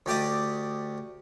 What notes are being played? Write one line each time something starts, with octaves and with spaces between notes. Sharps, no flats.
D2 G4 D5 D#5